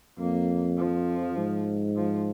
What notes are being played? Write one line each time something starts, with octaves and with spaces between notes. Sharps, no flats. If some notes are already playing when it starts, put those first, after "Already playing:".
F2 A#3
F3
G#2
F3